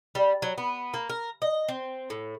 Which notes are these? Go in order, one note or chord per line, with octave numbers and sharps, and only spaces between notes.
G3
F#3
B3
A#3
A#4
D#5
C4
A2